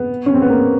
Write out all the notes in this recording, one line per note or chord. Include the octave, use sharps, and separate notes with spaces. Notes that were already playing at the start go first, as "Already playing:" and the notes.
Already playing: B3
C#4
C4
B3
A#3